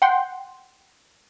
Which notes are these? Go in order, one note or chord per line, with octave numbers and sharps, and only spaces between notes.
F#5 G5 C6